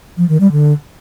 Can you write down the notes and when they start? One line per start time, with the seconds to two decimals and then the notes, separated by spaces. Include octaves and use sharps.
0.17 F3
0.29 D#3
0.40 G3
0.52 D3